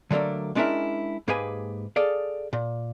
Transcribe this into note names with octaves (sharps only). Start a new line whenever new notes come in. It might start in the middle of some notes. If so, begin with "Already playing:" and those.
D3 F#3 A3 A#3 D4
G#3 C#4 D4 E4 A#4 E5
G#2 A#3 G4 G#4 B4 G#5
G#4 A4 D5 F5
A#2